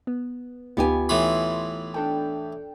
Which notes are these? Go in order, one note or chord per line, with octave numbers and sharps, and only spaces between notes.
B3
D2 B3 D#4 F4 G4 G#5
A2 E3 B5 C6
D4 A4 G5